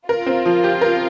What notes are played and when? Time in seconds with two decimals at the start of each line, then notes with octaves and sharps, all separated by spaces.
0.08 F4 A#4
0.26 C4
0.45 F3
0.64 G4
0.81 A#4